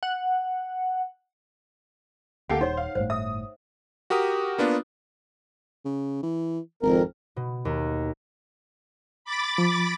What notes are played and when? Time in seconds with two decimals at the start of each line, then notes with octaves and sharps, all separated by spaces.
0.03 F#5
2.50 D2 A#3 G4 A4 F#5
2.61 D#1 D#4 C5 C#5
2.77 F5
2.95 G1 A2 C5
3.10 E5 D#6
4.10 F#4 G4 A#4 D#6
4.58 A#3 B3 D4 F4
5.85 C#3
6.23 E3
6.83 G#1 F2 A#4
7.36 B2
7.65 D#2
9.25 B5 D6 A6
9.58 F3